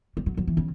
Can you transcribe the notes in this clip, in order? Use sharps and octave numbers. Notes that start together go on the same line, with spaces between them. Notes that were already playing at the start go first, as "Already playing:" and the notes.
G3
F#3
F#3
E3
C#3